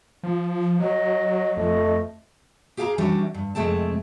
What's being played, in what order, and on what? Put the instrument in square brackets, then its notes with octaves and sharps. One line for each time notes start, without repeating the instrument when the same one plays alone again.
[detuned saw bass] F3
[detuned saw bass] F#3 [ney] D#5
[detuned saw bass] F2 [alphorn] A3 [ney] D#5
[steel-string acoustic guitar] G4 G#4 F5 A5 A#5
E3 F#3 G3 C#4 D4
G2
F2 C3 G#3 A3 C4 A5